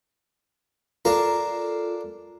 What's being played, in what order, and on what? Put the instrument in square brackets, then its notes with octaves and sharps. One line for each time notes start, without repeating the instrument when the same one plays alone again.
[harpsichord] D4 A#4 F5 [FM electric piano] F4 A4